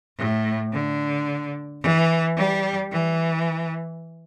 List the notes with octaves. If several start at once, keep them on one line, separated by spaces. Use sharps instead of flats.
A2
D3
E3
G3
E3